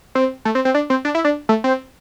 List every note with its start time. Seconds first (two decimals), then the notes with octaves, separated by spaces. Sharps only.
0.15 C4
0.45 A3
0.55 C4
0.65 C4
0.74 D4
0.90 C4
1.05 D4
1.15 E4
1.25 D4
1.49 A3
1.64 C4